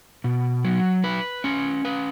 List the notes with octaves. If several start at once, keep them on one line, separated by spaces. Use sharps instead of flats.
B2
F#3
B4
C#4
B4